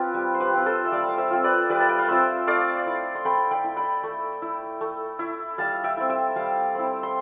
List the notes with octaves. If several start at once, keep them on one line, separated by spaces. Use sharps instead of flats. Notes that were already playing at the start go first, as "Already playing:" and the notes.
Already playing: C4 F4 G4 B4
G3
C5
G4 B4
C4 F4
A4 C5
E5
G3 D5 F5
F5
C5 E5
C4 F4
B4 D5
G3 B4 D5
A5
G5
F5
C4 F4 C5 E5
A3 D5 F5
E4
C6
A3 G5 B5
G5 B5
E4
G5 B5
A3
E4
A3
E4
G3 F5 A5
E5 G5
C4 E4
E5 G5
G3 F5 A5
C4 E4
C6